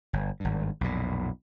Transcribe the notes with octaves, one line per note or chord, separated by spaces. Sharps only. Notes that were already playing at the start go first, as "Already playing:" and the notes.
G1
G#1 G2
B1 F2 A#2